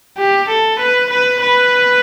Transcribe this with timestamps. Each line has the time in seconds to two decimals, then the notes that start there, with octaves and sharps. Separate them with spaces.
0.18 G4
0.48 A4
0.79 B4
1.10 B4
1.40 B4